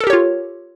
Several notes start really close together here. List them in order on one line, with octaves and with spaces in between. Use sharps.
A4 A#4 G4 C#5 F4